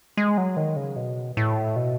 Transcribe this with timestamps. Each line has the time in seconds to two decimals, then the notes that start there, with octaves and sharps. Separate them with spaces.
0.17 G#3
0.38 F#3
0.57 D#3
0.76 C#3
0.96 B2
1.37 A2
1.76 B2